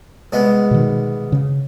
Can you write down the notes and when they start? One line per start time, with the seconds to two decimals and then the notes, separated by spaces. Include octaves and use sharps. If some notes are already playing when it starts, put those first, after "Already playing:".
0.32 C2 G#3 B3
0.71 B2 D#3
1.32 C#3